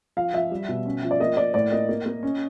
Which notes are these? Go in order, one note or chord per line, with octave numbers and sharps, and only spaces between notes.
F3 F5
F3 E5
G3
B2
C#4
F3
D5
A#3 D#5
A#3 D5
A2 D5
A#3 D#5
A#3
A#3
C#4